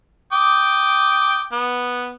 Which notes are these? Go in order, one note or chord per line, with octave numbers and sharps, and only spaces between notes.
G5 D6 D#6
B3